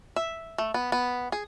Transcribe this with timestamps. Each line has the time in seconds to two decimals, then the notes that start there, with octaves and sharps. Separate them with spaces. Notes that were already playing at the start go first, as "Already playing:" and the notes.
0.16 E5
0.58 A3
0.74 B3
0.92 B3
1.32 G#4